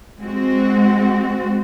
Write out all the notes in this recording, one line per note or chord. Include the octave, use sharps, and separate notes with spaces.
G#3 C4 F#4